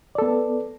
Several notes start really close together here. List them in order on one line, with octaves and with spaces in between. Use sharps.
D5 A4 B3